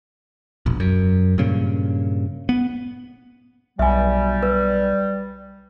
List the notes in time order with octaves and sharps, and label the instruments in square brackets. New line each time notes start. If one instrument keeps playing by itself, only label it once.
[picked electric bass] E1 A#1
F#2
G2 A#2 C#3
B3
[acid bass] B1 [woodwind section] G3 [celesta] E5 G#5
[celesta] B4